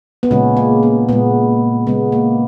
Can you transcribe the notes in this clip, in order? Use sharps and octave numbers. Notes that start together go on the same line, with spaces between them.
B3
A#2 C#3 G#3 C#4
A#3
B3
A#2 G#3 B3
C#3 G#3 B3
A#3